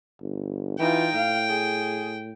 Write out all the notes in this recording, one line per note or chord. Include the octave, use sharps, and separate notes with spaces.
G1
E3 D#4 F4 G5
A2 F5
G#4